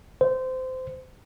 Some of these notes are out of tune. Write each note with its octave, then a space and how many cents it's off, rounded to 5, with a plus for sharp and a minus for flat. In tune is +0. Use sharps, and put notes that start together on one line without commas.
C5 -20